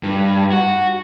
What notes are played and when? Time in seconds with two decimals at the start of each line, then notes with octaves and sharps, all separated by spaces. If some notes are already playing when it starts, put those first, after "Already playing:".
0.03 G2
0.52 F#4